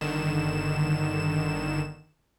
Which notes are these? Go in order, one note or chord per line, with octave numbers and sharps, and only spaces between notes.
G1 D3 D#3 E7